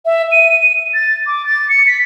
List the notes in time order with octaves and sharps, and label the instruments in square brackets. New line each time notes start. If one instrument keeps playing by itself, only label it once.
[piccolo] E5
D#7
A6
D6
A6
C#7
B6